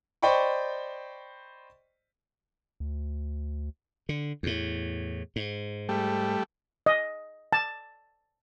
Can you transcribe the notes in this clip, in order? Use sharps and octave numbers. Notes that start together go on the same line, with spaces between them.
C5 D5 D#5 G5 B5 C#6
D2
D3
E2 A2
G#2
G3 A3
D#5
A5